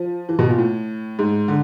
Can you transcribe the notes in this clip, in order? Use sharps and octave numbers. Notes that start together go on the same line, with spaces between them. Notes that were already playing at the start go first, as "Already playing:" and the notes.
Already playing: F3
E3
B2
A#2
A2
G#2
D3